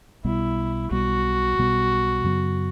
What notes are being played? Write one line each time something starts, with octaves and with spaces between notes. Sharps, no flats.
B1 B2 G3 B3 E4
B1 B2 G3 B3 F#4
B1 B2 G3 B3
F#2 C#3 F#3 B3